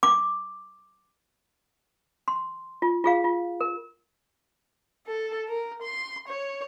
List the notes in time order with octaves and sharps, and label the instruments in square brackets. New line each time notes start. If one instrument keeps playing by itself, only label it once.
[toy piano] D6
C6
F4
F4 G#4 F5
F4
A#4
[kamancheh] A4
A#4
C6
C#5